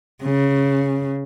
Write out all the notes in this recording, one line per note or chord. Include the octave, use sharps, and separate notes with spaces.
C#3